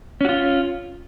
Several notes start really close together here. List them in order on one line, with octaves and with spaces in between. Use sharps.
C#4 F#4 F4